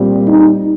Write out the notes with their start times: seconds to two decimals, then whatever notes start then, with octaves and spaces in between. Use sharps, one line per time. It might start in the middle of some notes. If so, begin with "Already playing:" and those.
Already playing: A#2 G3 C4
0.26 D#4